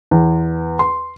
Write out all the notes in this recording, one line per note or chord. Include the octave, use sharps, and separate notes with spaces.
E2
C6